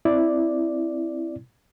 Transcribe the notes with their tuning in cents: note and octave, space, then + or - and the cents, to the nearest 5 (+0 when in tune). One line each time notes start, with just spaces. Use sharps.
C4 +0 E4 +0 D5 +0